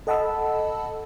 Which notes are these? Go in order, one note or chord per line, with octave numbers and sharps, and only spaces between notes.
A4 D#5 F#5 A5 B5 E6